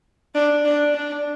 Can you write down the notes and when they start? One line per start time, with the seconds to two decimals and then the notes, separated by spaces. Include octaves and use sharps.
0.35 D4
0.65 D4
0.94 D4